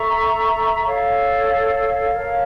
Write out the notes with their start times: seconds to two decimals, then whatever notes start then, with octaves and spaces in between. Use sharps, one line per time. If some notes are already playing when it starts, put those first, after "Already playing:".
Already playing: A4 E5 A#5 C#6
0.84 A4 C#5 F5
2.12 A#4 C#5 F5 A5